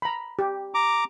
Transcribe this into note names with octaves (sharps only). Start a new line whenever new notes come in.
A#5 B5
G4
A#5 D6